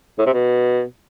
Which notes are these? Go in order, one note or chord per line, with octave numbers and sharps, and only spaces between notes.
A2
C3
B2